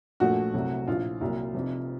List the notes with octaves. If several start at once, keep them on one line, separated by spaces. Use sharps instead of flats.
A#1 A#2 F3 A3 F#4
C2 C3 F#3 A3
A#1 A2 F3 F4
C2 A#2 F#3
F1 F2 C3